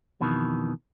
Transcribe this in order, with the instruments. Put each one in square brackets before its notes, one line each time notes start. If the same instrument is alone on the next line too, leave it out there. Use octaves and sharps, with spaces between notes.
[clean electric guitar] F2 B2 D#3 E3